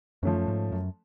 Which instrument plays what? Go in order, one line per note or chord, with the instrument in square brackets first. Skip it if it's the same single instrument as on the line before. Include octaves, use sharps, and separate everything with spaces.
[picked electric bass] F#2 [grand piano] F3 A3 C#4
[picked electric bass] G#2
F#2